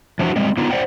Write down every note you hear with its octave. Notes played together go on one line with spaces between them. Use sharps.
E3 F3 D4 F4 F#4
G3 G#3 C4
D3 B3 D#4 F4
C5 D5 F#5 G5